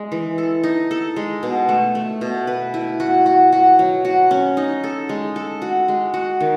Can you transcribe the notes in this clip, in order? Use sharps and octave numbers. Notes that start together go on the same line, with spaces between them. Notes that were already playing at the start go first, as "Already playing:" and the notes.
Already playing: G#3
E3
A4
D#4
A4
G#3
B2
A3
A3
B2
B4
E4
F#4
F#4
F#4
F#3
F#4
C#4
D#4
A4
G#3
A4
F#4
G#3
F#4
D#3